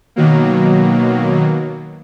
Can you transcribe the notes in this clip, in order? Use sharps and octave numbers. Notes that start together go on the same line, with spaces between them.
B2 D#3 F#3 A#3